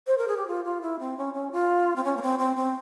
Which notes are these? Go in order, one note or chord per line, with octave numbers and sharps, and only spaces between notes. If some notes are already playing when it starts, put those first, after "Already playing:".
C5
A#4
G#4
G4
F4
F4
E4
C4
C#4
C#4
F4
C4
C#4
A#3
C4
C4
C4